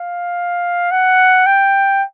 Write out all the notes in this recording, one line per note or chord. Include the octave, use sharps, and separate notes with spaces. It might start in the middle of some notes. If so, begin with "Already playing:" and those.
Already playing: F5
F#5
G5